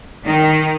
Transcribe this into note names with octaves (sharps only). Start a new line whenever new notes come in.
D#3